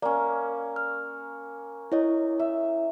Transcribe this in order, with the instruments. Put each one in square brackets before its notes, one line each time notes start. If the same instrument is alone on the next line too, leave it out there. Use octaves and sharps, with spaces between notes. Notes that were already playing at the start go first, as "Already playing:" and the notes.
[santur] A#3 C#4 [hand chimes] D5
[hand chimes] F6
E4 C#5 D#5
[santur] E5